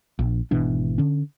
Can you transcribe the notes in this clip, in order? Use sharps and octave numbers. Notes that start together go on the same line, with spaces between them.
A#1
G#1 B2 E3 D4
D3 C#4